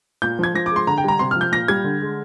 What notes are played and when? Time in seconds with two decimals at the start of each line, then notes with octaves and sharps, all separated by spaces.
0.22 A#2 G6
0.39 F3 G#6
0.54 F3 A#6
0.66 D6
0.71 G#3 C6
0.87 D3 A#5
0.98 G5
1.04 G3 A#5
1.19 C3 C6
1.31 F3 F6
1.41 G6
1.52 A#2 A#6
1.68 G3 G#6
1.84 D3
2.01 G#3